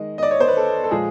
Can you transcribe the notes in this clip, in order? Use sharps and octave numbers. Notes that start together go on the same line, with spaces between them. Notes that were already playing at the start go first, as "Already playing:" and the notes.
Already playing: D#3 G#3 D#5
D#5
D5
C#5
C5
B4
A4
A4
A#2 F3 G#3 G#4